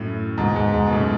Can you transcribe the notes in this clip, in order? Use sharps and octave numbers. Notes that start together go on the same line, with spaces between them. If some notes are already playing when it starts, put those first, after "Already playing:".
Already playing: F#2 A2
G#2 B2
G#2
G#2
B2
F#2 A2